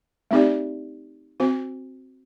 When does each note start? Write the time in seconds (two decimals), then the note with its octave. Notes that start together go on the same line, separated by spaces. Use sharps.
0.31 A3 C4 D#4 G4 D5
1.40 C4 F#4 C5